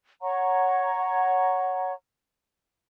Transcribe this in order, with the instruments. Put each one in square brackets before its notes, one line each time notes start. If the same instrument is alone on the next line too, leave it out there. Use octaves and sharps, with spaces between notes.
[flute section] C#5 F#5 A#5 C#6